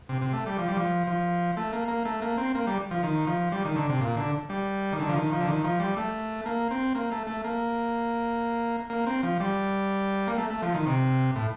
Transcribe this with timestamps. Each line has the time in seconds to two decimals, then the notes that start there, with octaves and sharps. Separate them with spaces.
0.09 C3
0.22 C3
0.33 A3
0.46 G3
0.58 F3
0.68 G3
0.77 F3
1.07 F3
1.57 A3
1.73 A#3
1.88 A#3
2.05 A3
2.22 A#3
2.38 C4
2.55 A#3
2.67 G3
2.91 F3
3.03 D#3
3.27 F3
3.52 G3
3.65 D#3
3.76 D3
3.89 C3
4.01 A#2
4.17 D3
4.49 G3
4.92 D#3
5.00 D3
5.09 F3
5.16 D#3
5.32 F3
5.40 D3
5.48 D#3
5.64 F3
5.80 G3
5.97 A3
6.46 A#3
6.71 C4
6.95 A#3
7.12 A3
7.27 A3
7.44 A#3
8.90 A#3
9.07 C4
9.23 F3
9.40 G3
10.27 A#3
10.38 A3
10.50 A3
10.62 F3
10.74 D#3
10.87 C3
11.36 A2